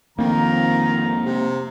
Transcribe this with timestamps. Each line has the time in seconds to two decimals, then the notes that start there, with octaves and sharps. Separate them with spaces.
0.19 F2 D#3 A#3 C4 F5 A#5
1.23 C3